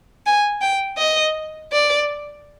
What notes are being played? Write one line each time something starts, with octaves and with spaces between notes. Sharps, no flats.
G#5
G5
D#5
D5